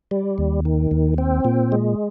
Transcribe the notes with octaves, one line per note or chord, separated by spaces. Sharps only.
G3
D#2
D#3
D#2
C4
A#2
G#3